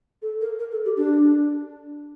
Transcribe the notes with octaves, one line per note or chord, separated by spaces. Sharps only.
A4
A#4
A#4
A4
G4
D4